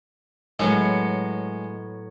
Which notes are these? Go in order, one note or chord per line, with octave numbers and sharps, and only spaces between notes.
A2 F#3 G#3 B3